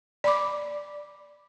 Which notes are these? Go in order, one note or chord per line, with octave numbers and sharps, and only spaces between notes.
D5 B5 D6